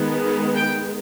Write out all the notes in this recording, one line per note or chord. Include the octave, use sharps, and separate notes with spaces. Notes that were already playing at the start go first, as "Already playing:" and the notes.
Already playing: D#3 G#3 B3
G5